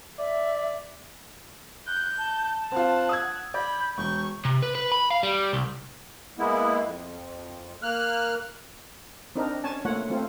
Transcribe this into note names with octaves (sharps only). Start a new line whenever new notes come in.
D5 E5
F#6 G6
A5
C4 F4 F#5
D#6 E6 G#6
D5 B5 G6
E1 C#6 G6
C3
B4
B4
B5
F5
G3
C2
G#3 A#3 B3 E4
F2
A#3 F6 F#6
C4 D4 D#4 A#4
C#4 C#5 G#5 A5
A3 A#3 F4 C#5 F#5
A3 C4 F4